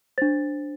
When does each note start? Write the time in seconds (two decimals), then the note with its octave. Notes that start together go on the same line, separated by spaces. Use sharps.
0.18 D4 C5 A6